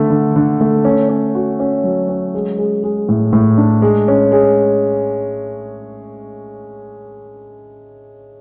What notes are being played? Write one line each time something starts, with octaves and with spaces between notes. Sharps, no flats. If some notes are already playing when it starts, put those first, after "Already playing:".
Already playing: D3 A3
D3
D3
A3
C#4
C#4
F#4
C#4
F#3
C#4
G#3
G#3
G#3
A2
A2
D4
G#3
C#4
G#3